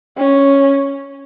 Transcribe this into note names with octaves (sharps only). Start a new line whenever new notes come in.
C#4